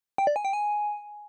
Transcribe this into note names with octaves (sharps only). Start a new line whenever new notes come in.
G5
D5
G#5
G5
G#5